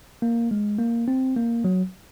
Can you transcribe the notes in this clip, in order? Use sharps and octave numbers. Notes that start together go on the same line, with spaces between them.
A#3
G#3
A#3
C4
A#3
F#3